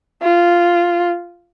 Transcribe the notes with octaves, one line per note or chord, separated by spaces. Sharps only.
F4